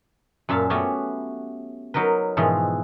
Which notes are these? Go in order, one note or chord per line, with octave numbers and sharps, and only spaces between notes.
F#2 A#2 E5 F5 A5
A3 B3 C#4 F#4 G4
F#3 D#4 A#4 B4
G#2 B2 E3 F3